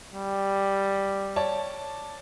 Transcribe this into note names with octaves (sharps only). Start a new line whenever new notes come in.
G3
C#5 D5 A5